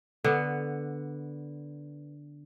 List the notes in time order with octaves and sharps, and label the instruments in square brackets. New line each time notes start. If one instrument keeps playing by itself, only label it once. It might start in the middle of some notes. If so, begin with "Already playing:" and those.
[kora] D3 B3